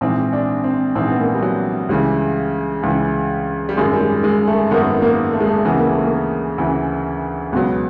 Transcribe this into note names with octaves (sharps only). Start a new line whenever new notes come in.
A#1 G#2 E3 C4
D4
C4
A#1 G#2 E3 C4
B3
A#3
G3
F#3
C#2 C#3 E3 G3
C#2 C#3 E3
G3
G#1 F#2 D#3 G#3
G3
G#3
G#3
A3
G#1 F#2 D#3 B3
A#3
A3
G#3
A3
D2 C#3 E3 B3
A#3
A3
A#3
D2 C#3 E3
C#2 B2 F#3 B3